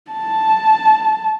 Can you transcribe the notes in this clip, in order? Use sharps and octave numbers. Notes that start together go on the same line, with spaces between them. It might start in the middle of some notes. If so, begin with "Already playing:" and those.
A5